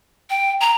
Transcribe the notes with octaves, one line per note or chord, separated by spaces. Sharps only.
G5
A#5